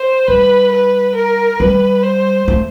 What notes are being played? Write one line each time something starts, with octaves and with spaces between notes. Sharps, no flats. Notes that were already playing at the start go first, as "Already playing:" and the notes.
Already playing: C5
G3 B4
B4
A#4
G3 B4
C5
A3